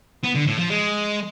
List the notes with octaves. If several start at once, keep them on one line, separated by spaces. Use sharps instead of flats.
B3
D3
A2
F3
G#3